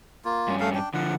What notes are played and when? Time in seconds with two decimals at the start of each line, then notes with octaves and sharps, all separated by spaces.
0.25 A#3 F4
0.48 G2 C#4
0.60 A3 F5
0.75 D4 G5
0.94 D3 F3 F#5